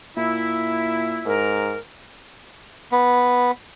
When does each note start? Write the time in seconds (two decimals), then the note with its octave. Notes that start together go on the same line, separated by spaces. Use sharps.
0.17 A#2 E4
1.26 G#2 A#4
2.92 B3